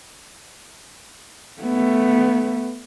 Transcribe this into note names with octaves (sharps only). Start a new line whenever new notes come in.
A3 B3